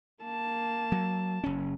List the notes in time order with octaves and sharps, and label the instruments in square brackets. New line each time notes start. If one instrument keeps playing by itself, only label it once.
[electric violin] A#3 A5
[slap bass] F#3
F#1 C#4